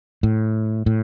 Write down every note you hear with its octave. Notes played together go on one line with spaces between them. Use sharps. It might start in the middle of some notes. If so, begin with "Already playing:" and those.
A2
A2